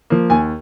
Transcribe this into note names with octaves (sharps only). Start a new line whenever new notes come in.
F3 A#3
D#2 G#5